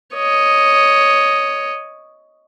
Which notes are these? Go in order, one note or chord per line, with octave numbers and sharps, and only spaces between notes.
C#5 D#5